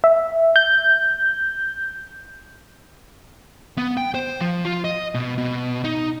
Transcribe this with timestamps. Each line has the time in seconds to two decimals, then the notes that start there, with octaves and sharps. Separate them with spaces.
0.04 E5
0.56 G6
3.78 B3
3.97 G5
4.15 C5
4.41 F3
4.65 F4
4.85 D#5
5.15 B2
5.38 B2
5.84 D#4